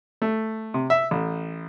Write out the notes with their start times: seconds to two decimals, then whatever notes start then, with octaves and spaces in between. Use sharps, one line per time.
0.22 A3
0.74 C3
0.90 E5
1.11 A1